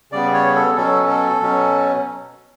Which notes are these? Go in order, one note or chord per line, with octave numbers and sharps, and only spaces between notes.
C#3 G3 B3 D5
C#5
A4
B2 F#3 C#4 A4
A4
B2 F#3 C#4